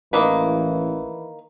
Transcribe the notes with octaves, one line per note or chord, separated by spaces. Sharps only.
A1 D#3 E3 A#3 B4